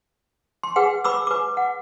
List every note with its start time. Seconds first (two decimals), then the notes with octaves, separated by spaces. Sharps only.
0.63 C6
0.76 G#4 B4 F#5 G5
1.04 B4 B5 D6 E6
1.27 B4 D6
1.57 F#5